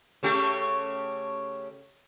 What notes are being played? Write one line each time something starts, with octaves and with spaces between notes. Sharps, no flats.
C#3 A3 G4